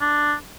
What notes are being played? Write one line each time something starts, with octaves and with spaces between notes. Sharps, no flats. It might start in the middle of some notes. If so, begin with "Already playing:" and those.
D4